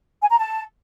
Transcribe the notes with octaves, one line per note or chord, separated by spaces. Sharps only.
G#5
A#5
A5